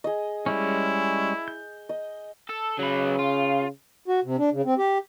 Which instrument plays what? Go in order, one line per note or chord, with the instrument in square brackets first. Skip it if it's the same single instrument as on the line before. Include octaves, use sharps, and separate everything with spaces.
[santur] G#4 D#5
[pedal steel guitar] G3 G#3 C#4 [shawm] E4
[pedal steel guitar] G6
[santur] D#5
[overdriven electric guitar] A4
[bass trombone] C#3 [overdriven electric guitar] F#3 B4
[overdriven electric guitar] F4
[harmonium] F#4
C3
D4
C#3
C4
G4